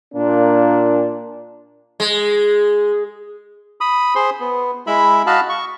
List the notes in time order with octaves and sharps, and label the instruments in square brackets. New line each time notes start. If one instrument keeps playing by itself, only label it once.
[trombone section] A#2 A#3 D4
[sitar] G#3
[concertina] B5 D#6
G#4 C5 C6
B3
G#3 E4 E5 B5
F#4 D#5 F5 A5 B5
C#6